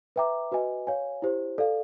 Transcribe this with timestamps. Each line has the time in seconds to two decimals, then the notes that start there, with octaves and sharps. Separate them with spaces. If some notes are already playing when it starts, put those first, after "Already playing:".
0.16 B4 E5 G5 A#5 D6
0.52 F#4 B4 D#5 G#5
0.87 C#5 F5 G#5
1.22 E4 G4 C5
1.58 A4 D5 F5